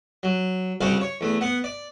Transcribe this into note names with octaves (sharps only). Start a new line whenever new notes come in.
F#3
C2 C#3 G3 F#4 C5 F5
C#5
E2 A3
B3 F#5
D5